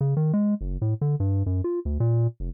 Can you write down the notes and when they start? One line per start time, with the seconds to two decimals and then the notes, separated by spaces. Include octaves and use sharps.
0.01 C#3
0.17 D#3
0.33 G#3
0.61 F#1
0.82 A2
1.01 D3
1.20 G2
1.46 F#2
1.64 F4
1.85 D2
2.00 A#2
2.40 F1